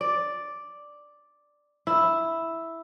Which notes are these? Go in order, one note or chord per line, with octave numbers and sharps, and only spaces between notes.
D5
E4